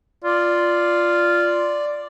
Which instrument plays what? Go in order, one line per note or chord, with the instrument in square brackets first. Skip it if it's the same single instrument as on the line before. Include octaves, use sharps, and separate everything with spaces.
[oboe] F4 [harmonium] D5